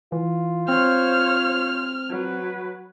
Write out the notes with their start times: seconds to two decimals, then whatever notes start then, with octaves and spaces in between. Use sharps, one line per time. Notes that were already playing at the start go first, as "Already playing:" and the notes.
0.12 E3 F4
0.68 C4 C5 C#5 F6
2.10 F#3 B4